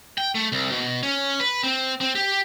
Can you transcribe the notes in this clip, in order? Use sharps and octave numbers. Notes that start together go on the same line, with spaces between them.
G5
A3
C2
B2
C#4
B4
C4
C4
G4